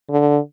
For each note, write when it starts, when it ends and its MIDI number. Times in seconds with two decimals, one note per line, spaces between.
0.10 0.38 50